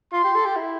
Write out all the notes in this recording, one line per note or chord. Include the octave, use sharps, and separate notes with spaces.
F4 C6
G4
A4
G4
E4